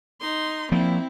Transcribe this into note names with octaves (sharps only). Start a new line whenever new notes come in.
D#4 C6
F3 A#3 C4 E4